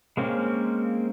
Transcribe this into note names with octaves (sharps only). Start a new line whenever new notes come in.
G#3 A#3 C4 C#4